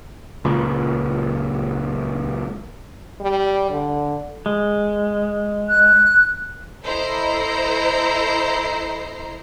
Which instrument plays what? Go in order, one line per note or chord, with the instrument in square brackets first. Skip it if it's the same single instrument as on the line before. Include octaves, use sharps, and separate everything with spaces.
[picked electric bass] C#2 A#2
[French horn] G3
D3
[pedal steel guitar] G#3
[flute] F#6
[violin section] E4 A4 C5 D#5 A#5 C7